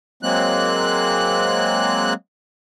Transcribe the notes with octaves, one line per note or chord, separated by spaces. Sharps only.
F#3 G#3 A#3 C4 F#6